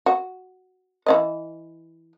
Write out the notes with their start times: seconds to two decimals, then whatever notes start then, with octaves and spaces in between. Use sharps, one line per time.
0.06 F#4
1.06 E3 C#4 D#5